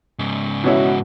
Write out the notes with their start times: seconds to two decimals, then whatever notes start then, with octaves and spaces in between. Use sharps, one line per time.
0.19 G#2 C#3
0.64 B2 E3 B3 C#4 E4 F#4